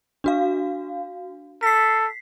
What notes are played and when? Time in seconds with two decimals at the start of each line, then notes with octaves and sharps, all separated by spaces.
0.24 D4 F#4 F5
1.63 A4 B6 C7